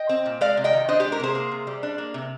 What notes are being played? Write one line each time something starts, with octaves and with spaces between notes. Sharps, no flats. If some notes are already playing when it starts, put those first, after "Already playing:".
Already playing: D#5 G5
C4
A#2
G#3 D5 F5
C3
D#5 G5
D#3
D4 C5 D#5
G4
G#3
G4 A#4
C3 G#4 C5
A#3
C3
G3
D4
A#3
C3